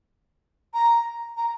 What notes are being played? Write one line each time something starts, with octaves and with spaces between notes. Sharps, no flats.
A#5
A#5